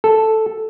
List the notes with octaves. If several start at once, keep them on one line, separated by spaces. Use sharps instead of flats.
A4